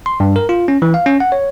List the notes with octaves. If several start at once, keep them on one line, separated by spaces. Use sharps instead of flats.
C6
G2
A#4
F4
C#4
E3
F5
C#4
F#5
C#5